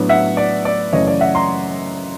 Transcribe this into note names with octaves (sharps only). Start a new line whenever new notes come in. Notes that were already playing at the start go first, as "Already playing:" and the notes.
Already playing: A2 F#3 B3 D4
E5 F#5
D5
D5
F#2 C#3 E3 A3 C#5 D#5
D5
E5 F#5
A#5 C6